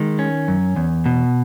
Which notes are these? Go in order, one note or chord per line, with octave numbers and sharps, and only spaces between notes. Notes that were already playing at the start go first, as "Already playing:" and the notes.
Already playing: D#3 G#3
C#4
F#2
E2
B2